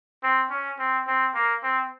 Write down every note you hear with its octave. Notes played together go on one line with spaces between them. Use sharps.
C4
C#4
C4
C4
A#3
C4